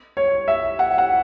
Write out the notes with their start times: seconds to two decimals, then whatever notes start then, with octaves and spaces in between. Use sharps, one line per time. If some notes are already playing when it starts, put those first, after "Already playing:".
0.17 C#5
0.48 E5
0.79 F#5
0.98 F#5